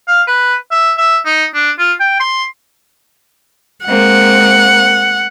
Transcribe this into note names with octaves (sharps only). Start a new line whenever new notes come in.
F5
B4
E5
E5
D#4
D4
F4
G5
C6
G#3 A#3 C4 F#5